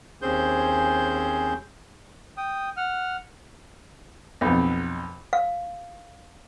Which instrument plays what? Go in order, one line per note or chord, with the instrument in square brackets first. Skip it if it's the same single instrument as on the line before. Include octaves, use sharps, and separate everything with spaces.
[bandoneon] D#2 C4 C#4 G#4 C5 G6
[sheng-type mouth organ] G5 D#6
F#5 F6
[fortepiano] B1 F2
[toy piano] F5